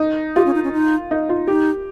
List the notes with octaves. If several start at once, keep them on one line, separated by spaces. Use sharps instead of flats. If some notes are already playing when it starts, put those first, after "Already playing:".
Already playing: D#4
F4 G4
C#4
D#4
C#4
D#4
D#4
F4
D#4 G4